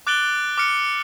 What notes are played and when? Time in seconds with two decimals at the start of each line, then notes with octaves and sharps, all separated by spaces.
0.07 D6 F#6 A6 D7 F#7 G7
0.58 D6 F6 C#7